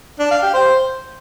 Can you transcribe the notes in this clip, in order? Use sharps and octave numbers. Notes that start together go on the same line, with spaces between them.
D4
F5
G4
C5